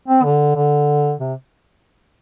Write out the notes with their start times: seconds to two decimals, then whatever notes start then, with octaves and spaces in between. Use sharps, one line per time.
0.08 C4
0.24 D3
0.56 D3
1.19 C3